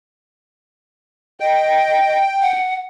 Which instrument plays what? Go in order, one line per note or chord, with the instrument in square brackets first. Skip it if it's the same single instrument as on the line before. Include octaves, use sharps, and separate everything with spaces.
[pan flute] D#5 [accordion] G5
[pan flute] F#5